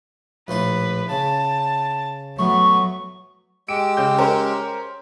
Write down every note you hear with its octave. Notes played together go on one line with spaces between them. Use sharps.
A#1 A2 B4 C5
C#3 A5
A2 F#3 B3 C#6
G#3 G4 E6 D7
C#3 G6
C#4 A#4 C5